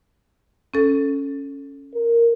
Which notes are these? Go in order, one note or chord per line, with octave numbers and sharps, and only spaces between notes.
C#4 A4
A#4